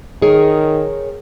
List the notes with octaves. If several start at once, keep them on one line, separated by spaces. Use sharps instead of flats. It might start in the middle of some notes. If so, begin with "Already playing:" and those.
D#3 G#4 A#4 C#5